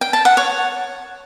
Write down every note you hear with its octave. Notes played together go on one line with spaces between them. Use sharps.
G5
A5
F#5
C#5